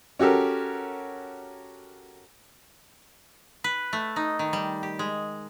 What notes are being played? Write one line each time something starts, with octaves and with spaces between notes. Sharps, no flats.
C#4 F#4 G4 A4 A#4
B4
A3
D#4
D#3
G3
G4
G#3